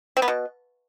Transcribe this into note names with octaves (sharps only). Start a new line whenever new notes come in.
C4
B3
B2